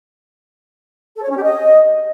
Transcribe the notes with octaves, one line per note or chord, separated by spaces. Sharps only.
A4
C#5
C#4
G4
D#5